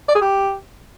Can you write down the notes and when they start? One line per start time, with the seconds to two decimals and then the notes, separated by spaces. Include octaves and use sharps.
0.09 D5
0.15 G#4
0.21 G4